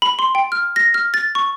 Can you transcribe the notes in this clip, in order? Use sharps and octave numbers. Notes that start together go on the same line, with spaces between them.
B5
C6
G5
F6
A#6
F6
A6
C#6